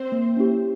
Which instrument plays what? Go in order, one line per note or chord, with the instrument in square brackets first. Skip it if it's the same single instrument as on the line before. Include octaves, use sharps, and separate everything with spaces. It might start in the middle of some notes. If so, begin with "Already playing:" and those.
Already playing: [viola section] C4 C5
[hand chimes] A#3
C#4 E4 G4